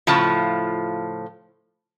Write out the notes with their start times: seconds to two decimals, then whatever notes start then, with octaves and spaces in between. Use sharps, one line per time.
0.07 A2 C#3 F3 F4 A5